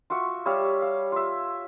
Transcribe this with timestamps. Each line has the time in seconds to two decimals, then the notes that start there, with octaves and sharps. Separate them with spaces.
0.10 F4 F#4 E5 C#6
0.46 G3 C#5 E5 F5
0.82 F5
1.12 F4 E5